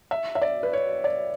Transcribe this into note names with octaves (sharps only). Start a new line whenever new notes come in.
E5
E5
D5
B4
C#5
D5